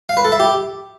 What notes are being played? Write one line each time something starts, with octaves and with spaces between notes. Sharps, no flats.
F5
B4
A4
E5
G4